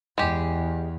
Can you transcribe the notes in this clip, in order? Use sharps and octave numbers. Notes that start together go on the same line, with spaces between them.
E2 G#3 G4